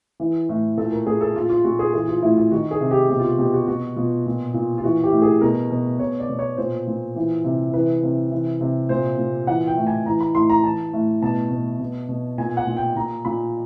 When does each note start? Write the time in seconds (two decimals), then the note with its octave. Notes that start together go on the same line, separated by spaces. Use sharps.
0.20 E3
0.49 A2
0.77 A#2 A4
0.92 A#4
1.07 A#2 G#4
1.21 A4
1.35 A#2 F4
1.50 F4
1.64 A#2 F#4
1.79 G#4
1.94 E3 G#4
2.08 F4
2.22 A2 E4
2.37 F4
2.52 D#3 F#4
2.71 G#4
2.81 C3
2.91 G4
3.09 B2 G4
3.19 F4
3.25 F#4
3.39 B2 G4
3.54 F#4
3.68 B2 F#4
3.96 B2 F4
4.26 A#2
4.54 A#2
4.78 F4
4.84 E3 F#4
5.03 G4
5.12 A2
5.22 G#4
5.41 B2 A#4
5.70 B2
5.99 B2 C#5
6.20 D5
6.29 B2
6.39 C#5
6.57 A#2 C5
6.87 A#2
7.16 E3
7.44 C3
7.74 E3 B4
8.03 C3
8.31 E3
8.61 C3
8.89 A#2 C5
9.18 A#2
9.47 E3 F#5
9.67 G5
9.77 A2
9.87 G#5
10.06 E3 A#5
10.21 B5
10.34 A2 C6
10.50 A#5
10.64 E3 A5
10.93 A2
11.22 B2 A5
11.51 B2
11.80 B2
12.09 B2
12.38 A#2 G#5
12.57 F#5
12.67 A#2
12.77 G5
12.96 A#2 A#5
13.25 A#2 B5